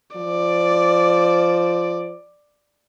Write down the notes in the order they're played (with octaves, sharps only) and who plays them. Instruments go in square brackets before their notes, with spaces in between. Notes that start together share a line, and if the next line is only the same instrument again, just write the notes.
[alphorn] F3 [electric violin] D5